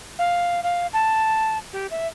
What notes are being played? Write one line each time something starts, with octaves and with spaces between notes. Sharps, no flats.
F5
F5
A5
G4
E5